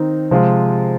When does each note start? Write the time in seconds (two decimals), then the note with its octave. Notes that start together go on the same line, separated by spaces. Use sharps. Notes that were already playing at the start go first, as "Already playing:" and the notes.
Already playing: D#3 C4 D#4
0.31 C3 F3 G#3 F4